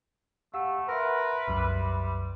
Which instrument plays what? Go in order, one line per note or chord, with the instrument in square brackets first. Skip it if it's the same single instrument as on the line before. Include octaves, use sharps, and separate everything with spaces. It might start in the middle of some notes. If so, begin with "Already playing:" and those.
[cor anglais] A3 [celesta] G4 F#5 [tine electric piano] F5 E6
[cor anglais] A#4 [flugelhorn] B4 [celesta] E5 C6 [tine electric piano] F#5
[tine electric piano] C2 F#2 F#3 [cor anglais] G3